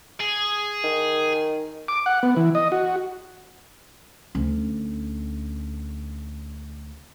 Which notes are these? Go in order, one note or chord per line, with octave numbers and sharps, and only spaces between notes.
G#4
D#3
D6
F#5
B3
E3
D#5
F#4
D2 C#4